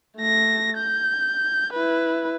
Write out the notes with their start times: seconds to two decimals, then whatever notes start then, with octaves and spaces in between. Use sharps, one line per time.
0.18 A3 A#6
0.78 G6
1.73 E4 B4